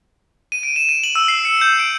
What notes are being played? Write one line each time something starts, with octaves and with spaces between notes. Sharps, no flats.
D#7
D7
E7
D#7
F#7
E6
C7
C#7
G6
D7